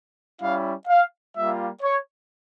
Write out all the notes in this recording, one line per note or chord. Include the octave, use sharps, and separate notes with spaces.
G3 C#4 E4 F5
F5
G3 A#3 F4 E5
C#5